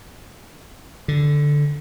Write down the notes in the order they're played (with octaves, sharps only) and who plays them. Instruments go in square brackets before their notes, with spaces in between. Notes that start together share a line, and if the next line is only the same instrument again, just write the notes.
[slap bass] D3